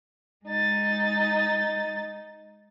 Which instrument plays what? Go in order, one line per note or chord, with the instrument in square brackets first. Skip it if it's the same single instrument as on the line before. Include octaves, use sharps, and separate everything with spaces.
[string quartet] G#3 D#4 A6